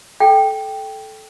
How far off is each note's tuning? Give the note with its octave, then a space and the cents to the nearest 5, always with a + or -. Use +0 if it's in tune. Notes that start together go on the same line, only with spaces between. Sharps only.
A4 -20 G5 +0